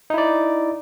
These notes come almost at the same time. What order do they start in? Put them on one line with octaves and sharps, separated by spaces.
D#4 E4 D5